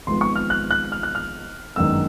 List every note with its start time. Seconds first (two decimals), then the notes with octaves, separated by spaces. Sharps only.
0.07 G#1 G#2 F3 G#3 B3 C6
0.21 C#6
0.36 F6
0.50 F#6
0.71 F#6
0.92 F6
1.03 F#6
1.15 F6
1.76 G1 F#2 D#3 G#3 E6